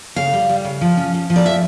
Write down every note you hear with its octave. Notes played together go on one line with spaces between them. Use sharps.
C#3 F5
G3
G3
C#3
F3
C#4
F3
F3
D5
E5